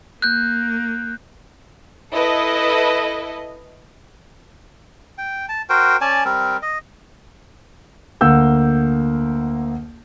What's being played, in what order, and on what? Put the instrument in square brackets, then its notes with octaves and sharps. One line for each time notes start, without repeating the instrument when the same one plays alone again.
[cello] A#3 [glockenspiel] F#6 G6
[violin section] E4 A4 B4 D#5
[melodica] G5
A5
F#4 A#4 C5 G5
C#4 D5 G#5 A5
G3 C4 A#4
D#5
[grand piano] D2 A#3 F#5 E6 G6